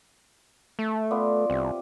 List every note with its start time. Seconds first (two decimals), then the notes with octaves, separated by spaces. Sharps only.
0.79 A3
1.11 B3 F4 D5
1.50 C2 C3